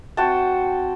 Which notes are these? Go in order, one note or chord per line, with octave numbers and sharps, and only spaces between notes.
C4 F#4 G5 A5